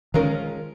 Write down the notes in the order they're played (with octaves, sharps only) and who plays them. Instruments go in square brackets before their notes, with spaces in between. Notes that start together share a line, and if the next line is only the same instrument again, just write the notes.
[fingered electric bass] D#3 [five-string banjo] F3 G#3 C#4 F4 A#4